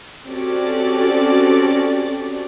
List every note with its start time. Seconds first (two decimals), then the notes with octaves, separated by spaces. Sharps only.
0.29 C4 C#4 F#4 G4 A4 D5